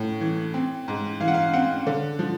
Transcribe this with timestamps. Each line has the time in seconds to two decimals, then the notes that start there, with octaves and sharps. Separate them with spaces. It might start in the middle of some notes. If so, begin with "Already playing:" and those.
Already playing: A2
0.21 E3
0.54 C4
0.88 G#2
1.20 E3 F5
1.28 F#5
1.34 F5
1.53 C4 F#5
1.87 D3
2.19 F3